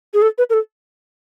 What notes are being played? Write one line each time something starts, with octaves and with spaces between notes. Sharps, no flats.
G#4
A4
B4
A#4
A4